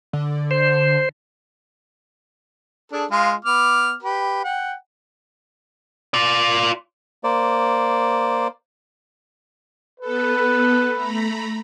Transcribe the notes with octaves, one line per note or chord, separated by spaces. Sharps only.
D3
C5
D4 G#4 A4
G#3 F4 F5
B3 D6 F6
G4 B4
F#5 G5
F4 D5
A#3 C5 D5
B3 A4 B4
A3 A#5 B5